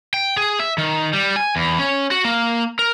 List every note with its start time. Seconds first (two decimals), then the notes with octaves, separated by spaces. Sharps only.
0.14 G5
0.37 G#4
0.60 E5
0.78 D#3
1.13 G3
1.36 G#5
1.56 E2
1.79 C#4
2.11 F#4
2.25 A#3
2.79 A#4